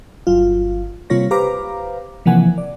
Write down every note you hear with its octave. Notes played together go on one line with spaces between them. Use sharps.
G1 F#3 F4
C3 G3 A#3 F4 C#5 A#6
G4 B4 C5 F5 A#5 D6
C3 E3 F3 A#3 F#5 G#5
D5